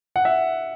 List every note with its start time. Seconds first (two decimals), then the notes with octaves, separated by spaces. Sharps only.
0.16 F#5
0.25 E5